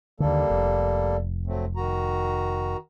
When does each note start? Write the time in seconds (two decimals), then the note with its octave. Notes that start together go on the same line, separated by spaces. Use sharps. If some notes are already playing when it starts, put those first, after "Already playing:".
0.20 D#2 D3 G3 A#3 A4
0.50 F1
1.47 F#3 A3 C4
1.76 D#3 F#4 A#5